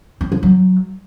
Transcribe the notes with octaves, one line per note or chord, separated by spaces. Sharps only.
C4
F3
F#3